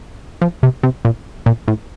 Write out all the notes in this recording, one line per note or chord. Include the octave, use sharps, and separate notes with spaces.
F3
C3
C3
A#2
A#2
A2